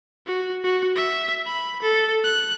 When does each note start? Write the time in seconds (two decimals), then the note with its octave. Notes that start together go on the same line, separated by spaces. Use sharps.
0.26 F#4
0.64 F#4
0.96 E5
1.46 B5
1.82 A4
2.24 F#6